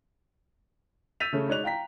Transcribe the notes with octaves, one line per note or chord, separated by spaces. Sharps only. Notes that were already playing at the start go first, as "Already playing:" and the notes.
E6 G6 A6 B6 D#7 F7
C#3 A3 C#4
G#3 D#4 C#5 D5 F#6 F7
F5 G5 A#5 B6